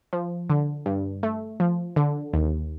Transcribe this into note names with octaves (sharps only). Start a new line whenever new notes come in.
F3
D3
G2
A3
F3
D3
D#2